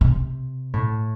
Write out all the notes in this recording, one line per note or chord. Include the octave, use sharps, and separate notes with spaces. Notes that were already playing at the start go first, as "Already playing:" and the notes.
C3
A2